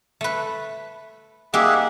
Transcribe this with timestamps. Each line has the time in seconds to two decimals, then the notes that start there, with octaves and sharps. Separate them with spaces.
0.21 A3 B4
1.54 A#3 D#4 G4 G#4 E5 F#5